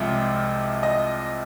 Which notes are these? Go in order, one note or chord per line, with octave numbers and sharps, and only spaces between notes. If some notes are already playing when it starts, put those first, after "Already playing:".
Already playing: C2 C3 F3 G#3
D#5